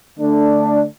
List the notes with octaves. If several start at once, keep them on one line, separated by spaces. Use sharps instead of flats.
D3 A3 D4